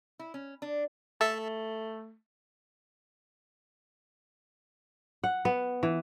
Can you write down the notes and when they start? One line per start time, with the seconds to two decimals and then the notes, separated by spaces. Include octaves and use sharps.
0.19 E4
0.34 C#4
0.62 D4
1.21 A3 A4 E5 A5
5.24 F#5
5.45 B3
5.83 E3